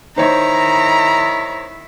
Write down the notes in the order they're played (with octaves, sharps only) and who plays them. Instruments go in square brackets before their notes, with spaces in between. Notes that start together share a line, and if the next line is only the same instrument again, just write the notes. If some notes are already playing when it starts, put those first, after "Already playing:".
[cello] D#3 E4 [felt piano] D#4 C5 C#5 [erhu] A#5